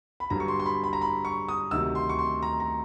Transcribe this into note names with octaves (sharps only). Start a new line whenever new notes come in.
B5
G2 D3 F#3 A#5
C#6
C6
C6
B5
B5
A#5
B5
C#6
D#6
D2 C3 D#3 F#3 E6
C6
C#6
C6
A#5
A#5